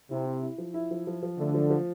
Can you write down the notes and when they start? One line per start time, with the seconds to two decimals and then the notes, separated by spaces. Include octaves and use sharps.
0.10 C3 E4
0.26 E4
0.42 E4
0.58 F3
0.74 E4
0.91 F3
1.07 F3
1.22 F3
1.38 D3 A3
1.54 F3
1.70 F3